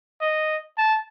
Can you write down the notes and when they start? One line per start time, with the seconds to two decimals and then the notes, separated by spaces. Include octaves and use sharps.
0.21 D#5
0.78 A5